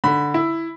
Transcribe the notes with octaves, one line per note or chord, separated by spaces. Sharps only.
D3 B5
E4